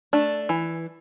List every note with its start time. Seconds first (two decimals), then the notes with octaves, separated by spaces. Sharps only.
0.13 A3 D4
0.49 E3